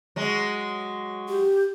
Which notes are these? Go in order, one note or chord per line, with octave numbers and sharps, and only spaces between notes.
F#3 G#3
G4